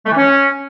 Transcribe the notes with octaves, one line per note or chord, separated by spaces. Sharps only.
A3
E3
C#4